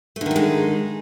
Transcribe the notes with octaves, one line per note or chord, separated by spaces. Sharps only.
D3 D#3 G#3 A3 D#4